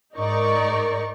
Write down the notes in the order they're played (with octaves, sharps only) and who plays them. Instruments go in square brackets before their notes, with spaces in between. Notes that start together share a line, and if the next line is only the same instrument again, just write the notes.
[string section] G#2 D#4 A#4 D5 C#6